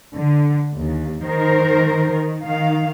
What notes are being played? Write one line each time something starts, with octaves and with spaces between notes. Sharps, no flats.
D3
D#2
D#3 A#4 C5
D#3
D#3 F5